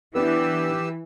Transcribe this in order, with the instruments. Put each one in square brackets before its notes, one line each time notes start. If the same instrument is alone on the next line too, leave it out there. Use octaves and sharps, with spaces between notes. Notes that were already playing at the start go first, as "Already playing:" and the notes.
[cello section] E3 [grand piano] B3 D4 [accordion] G4 B4 E6